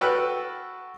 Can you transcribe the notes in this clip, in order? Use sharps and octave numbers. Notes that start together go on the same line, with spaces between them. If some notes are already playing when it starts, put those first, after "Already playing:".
F#4 A4 B4 G5 F6 F#6